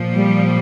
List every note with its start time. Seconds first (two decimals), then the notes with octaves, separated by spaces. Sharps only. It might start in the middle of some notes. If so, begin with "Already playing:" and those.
Already playing: A#2 F3
0.14 G3